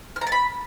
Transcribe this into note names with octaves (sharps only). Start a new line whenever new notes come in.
F6
A#5
A5
B5